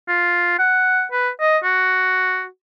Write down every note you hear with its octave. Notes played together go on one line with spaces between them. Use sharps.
F4
F#5
B4
D#5
F#4